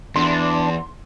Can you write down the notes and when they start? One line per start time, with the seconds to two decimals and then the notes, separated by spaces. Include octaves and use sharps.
0.16 E2 D4 C6